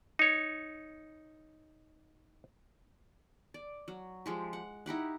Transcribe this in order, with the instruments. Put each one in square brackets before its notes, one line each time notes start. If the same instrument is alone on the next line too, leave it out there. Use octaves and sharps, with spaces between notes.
[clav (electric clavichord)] D#4 C#5
[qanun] D5
F#3
F3 G#3 G4
F#5
D#4 E4 G4 F#5